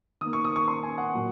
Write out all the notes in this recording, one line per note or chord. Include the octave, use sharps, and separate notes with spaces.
D#3 A#3 D#6
C#6
D#6
C#6
C6
G#5
F#5
A#2 F#3 A#3